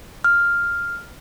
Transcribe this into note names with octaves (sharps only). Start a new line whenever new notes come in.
F6